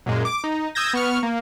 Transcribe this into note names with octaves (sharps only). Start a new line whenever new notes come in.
F#2 A#2 G#3
D6
D#4
D#6 E6 G6 G#6 A#6
B3 C#6 F6
A#3